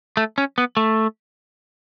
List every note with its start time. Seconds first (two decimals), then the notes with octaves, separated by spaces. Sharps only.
0.17 A3
0.38 C#4
0.58 B3
0.77 A3